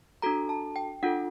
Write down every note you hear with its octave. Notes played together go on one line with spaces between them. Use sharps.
D4 F#4 A4 A#5
A5
G5
D4 F4 A4 F#5